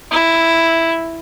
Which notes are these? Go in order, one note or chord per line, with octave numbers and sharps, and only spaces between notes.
E4